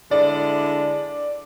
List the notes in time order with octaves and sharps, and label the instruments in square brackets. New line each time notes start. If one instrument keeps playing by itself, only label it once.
[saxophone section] D3 G#3 E4 [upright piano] D5